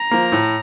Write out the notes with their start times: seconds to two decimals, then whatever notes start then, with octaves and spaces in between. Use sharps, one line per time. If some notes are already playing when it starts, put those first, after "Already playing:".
Already playing: A#5
0.11 F3 A#3
0.32 A2